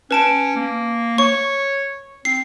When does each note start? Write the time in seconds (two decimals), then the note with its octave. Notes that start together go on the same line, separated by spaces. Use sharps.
0.11 C#4 B4 A5 D7
0.56 A#3
1.18 C#5 C#6
2.25 C4 C7